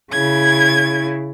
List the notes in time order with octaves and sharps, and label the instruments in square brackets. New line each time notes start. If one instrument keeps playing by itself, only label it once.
[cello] C#3 E4 [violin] G#6